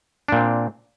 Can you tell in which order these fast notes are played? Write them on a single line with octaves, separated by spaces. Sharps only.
D4 A#2 C4